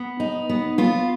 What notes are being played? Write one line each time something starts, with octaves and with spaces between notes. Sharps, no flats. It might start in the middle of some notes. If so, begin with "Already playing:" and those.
Already playing: B3
D#4
B3
B3 F4